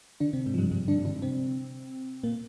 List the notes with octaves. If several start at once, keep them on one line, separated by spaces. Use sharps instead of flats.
D3 D4
C3 C4
G#2 G#3
F3
G2 G3
G2 G3
D3 D4
D3 D4
C3 C4
A#2 A#3